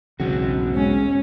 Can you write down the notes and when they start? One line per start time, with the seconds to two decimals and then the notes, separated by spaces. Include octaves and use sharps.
0.20 B1 E2 G#2 C#3 C4 F#4
0.75 G#3 C#4